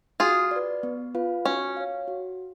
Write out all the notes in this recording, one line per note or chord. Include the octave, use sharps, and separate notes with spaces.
F4 F#4 G#4
B4 D5
B3
F4 B4 F5
C#4 F#4
C#5 F5
F#4